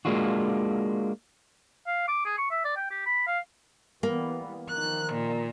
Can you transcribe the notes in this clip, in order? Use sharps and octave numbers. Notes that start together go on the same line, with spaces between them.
G#3 A#3 D4 F4 F#4
F5
D6
G#4
C#6
E5
D5
G5
G4
B5
F5
E3 G3 A#3 B3
D#3 F3 A#4 F#6
A#2